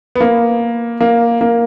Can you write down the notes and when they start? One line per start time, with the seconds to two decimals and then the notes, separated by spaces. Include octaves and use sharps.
0.15 B3
0.21 A#3
1.01 A#3
1.41 A#3